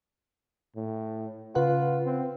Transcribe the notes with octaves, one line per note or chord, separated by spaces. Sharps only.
A2
C#3 F4 B4 F#5
C4